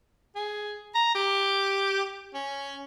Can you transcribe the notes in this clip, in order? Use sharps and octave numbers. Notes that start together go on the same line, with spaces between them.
G#4
A#5
G4
C#4